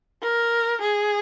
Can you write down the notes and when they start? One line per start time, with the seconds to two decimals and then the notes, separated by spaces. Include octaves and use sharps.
0.23 A#4
0.81 G#4